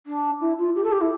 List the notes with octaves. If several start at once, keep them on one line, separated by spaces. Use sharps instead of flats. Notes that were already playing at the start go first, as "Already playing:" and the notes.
D4
E4
F4
G4
A4
G4
E4